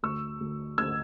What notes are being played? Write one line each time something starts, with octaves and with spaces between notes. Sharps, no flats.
D2 C#6 E6
D2
D2 E6 G#6